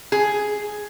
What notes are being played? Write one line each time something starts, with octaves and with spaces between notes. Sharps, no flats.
G#4